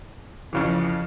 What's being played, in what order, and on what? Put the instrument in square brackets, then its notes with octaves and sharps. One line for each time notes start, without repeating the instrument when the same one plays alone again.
[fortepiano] F2 C#3 E3